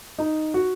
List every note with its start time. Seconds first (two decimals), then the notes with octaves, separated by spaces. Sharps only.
0.18 D#4
0.54 F#4